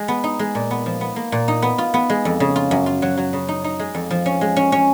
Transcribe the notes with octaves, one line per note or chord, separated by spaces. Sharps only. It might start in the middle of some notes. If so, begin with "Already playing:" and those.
Already playing: G#3
B3
D#4
G#3
A#2
B3
F3
B3
A#3
A#2
D#4
B3
F4
B3
G#3
F2
C#3
F4
F#2
F4
F#3
F#3
C#3
D#4
D#4
G#3
F2
F3
C#4
G#3
C#4
C#4